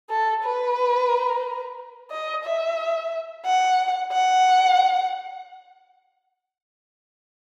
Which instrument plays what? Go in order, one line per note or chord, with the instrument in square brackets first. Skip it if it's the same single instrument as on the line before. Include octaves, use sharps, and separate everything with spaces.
[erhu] A4
B4
D#5
E5
F#5
F#5